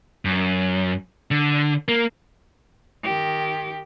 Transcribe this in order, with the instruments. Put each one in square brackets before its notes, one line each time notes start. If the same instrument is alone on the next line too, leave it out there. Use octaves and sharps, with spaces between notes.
[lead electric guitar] F#2
D3
A#3
[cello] D#3 G4